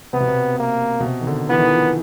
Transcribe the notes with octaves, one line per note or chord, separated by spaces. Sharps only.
C3 B3
B2
C3
A#3
B2
C3
D#3
D3
E3 B3
D#3
E3
F3